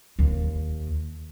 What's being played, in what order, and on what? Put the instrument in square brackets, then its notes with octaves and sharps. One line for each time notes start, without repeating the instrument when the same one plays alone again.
[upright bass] D#2